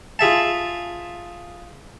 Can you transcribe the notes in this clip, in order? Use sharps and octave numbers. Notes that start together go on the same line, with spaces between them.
F4 G#4 E5 A5